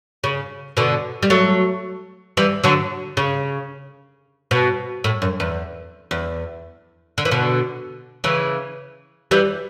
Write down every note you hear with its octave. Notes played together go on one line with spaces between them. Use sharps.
C#3
B2 D3
G3
F#3 A3
E3 G3
D3 F#3
C#3
B2
A2
F#2
E2
E2
D3
E3
B2 D3
C#3 E3
E3 G3